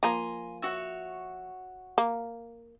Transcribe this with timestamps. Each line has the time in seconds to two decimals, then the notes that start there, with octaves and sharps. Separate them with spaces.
0.03 F3 A#3 G#5 A#5 C6
0.62 F#4 C#5 E5
1.98 A#3